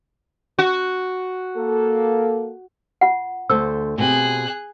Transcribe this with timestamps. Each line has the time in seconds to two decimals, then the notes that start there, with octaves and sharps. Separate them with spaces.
0.59 F#4
1.57 A#3 A4
3.01 F4 F#5
3.50 D2 A4 C5 E6
3.98 B2 C4 G4 G#4 F#6